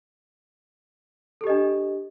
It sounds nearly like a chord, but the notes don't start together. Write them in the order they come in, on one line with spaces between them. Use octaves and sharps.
A4 G4 D#5 D4